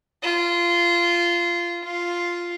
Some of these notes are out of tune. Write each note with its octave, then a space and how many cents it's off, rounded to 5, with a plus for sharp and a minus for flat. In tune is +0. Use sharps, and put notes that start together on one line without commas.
F4 -15
F4 +0